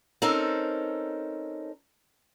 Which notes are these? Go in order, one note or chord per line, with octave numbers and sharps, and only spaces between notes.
C4 C#4 D#4 A4 A#4